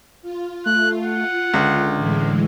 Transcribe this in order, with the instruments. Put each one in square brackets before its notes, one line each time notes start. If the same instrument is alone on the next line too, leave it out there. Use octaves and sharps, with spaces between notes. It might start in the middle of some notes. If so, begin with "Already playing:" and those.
[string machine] F4
[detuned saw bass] A3 [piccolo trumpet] F#6
[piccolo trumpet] F#5
[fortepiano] C#2 [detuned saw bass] D3
[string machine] A2 E3 G#3